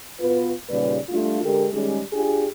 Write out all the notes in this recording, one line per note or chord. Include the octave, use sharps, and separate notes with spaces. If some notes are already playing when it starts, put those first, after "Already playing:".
B2 B3 F4 B4
D#2 A#2 C#3 G3 B4 D5
G3 A3 D4 F4
D3 G#3 G4 A4 A#4
D#3 G3 G#3 C#4 G4 G#4
D4 F4 G4 G#4